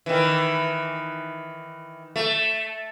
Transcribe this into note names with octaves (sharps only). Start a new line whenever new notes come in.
D#3 E3
A3